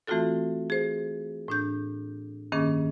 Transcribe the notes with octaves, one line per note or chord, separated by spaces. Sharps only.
E3 A3 C4 F4 F#4 A4
G#4 C5
A2 D4 G6
G2 D#3 A#3 C#4 G#4 D6